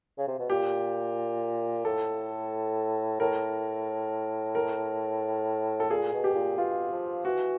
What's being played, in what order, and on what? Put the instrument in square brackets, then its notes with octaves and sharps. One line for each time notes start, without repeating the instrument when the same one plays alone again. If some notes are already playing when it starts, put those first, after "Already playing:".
[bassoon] C#3
C3
B2
[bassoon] A#2 [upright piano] G4
[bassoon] A2 [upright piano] A4
[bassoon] A2 [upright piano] A#4
[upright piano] A#4
A4
[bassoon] A#2 [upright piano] G#4
[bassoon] B2
[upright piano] G4
[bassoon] A#2
[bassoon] B2 [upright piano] F4
[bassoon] F3
[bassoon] E3 [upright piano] F#4